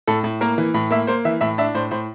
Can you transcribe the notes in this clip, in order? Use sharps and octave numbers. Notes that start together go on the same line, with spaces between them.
A2 A4
A2
A#3 A#4
E3
A2
A#3 E5
A#3 C5
E3 E5
A2 E5
D4 E5
A2 C5
A2 C5